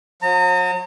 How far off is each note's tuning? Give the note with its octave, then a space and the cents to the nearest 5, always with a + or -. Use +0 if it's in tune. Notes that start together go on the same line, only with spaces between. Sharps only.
F#3 -45 A#5 -40